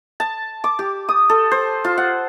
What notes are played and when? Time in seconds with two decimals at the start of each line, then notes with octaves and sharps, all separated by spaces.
0.20 A5
0.64 D6
0.79 G4
1.09 D#6
1.30 A4
1.51 C5
1.84 F4
1.98 F#5